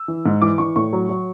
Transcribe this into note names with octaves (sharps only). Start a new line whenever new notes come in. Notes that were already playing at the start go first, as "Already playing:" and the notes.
Already playing: E6
E3
G#2
E3 D6
E3 C#6
A2 C#6
F#3
F#3